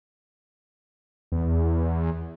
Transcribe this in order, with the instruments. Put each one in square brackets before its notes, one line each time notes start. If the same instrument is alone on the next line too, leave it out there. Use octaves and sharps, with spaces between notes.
[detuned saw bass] E2